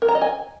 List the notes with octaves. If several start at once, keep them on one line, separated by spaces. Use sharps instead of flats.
A#4
A#5
D#5
G#5